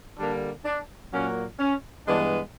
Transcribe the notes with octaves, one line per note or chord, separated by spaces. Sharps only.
D3 G3 A#3 D4
D4
A#2 F#3 A#3 C#4
C#4
G2 E3 G#3 B3 D4